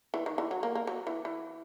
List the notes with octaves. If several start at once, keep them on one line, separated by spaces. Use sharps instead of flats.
E3
D#3
E3
F#3
A#3
A#3
F#3
E3
E3